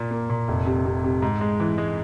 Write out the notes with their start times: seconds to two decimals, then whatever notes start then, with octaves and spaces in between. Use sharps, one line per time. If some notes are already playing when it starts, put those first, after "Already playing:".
Already playing: A#2 A#3
0.11 A#3
0.30 A#2
0.48 F1
0.66 C3
0.85 C3
1.04 C3
1.22 G#2
1.41 G#3
1.60 E3
1.78 G#3